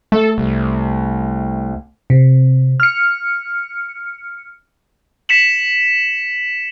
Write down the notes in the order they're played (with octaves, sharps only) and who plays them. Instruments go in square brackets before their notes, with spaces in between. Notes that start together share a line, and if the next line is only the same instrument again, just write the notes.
[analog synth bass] A3 [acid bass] A4
[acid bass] C2
[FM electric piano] C3
F6 C#7
[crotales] B6 C#7 E7 F#7